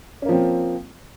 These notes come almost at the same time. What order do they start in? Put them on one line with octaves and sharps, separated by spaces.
C#4 A#3 F3 C4